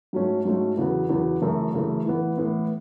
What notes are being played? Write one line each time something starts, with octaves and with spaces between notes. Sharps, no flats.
G#2 F#3 A3 C#4
G#2 F#3 A3 C#4
E2 C#3 F#3 B3
E2 C#3 F#3 B3
F#2 C#3 E3 A3
F#2 C#3 E3 A3
A2 E3 B3
A2 E3 B3